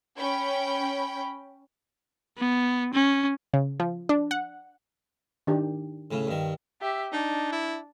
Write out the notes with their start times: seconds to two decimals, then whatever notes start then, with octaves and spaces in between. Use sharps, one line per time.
0.17 C#4 G5 B5
2.37 B3
2.94 C#4
3.54 C#3
3.80 F3
4.09 D4
4.31 F#5
5.47 D#3 D4 G4
6.11 A2 C#3
6.27 G2 D#3
6.82 G4 E5
7.12 D4 D#4
7.52 E4